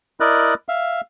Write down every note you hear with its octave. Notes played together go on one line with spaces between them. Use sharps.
E4 A#4 D5 D#5 F#6
E5 F5